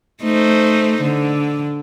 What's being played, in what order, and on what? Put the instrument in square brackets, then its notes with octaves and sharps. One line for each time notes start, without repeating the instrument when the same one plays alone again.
[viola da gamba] A3 D#4 C5
D3